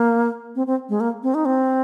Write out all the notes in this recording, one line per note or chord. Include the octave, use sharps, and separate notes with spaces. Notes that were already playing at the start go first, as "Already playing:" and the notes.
Already playing: A#3
C4
C4
G#3
A#3
C4
D#4
C4